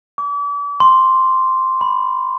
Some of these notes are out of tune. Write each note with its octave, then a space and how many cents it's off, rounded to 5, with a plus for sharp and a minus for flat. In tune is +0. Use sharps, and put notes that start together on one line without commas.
D6 -40
C6 +0
B5 +15